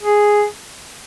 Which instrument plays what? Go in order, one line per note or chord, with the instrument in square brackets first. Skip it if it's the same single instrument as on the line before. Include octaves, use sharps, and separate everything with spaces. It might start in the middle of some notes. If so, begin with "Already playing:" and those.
[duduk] G#4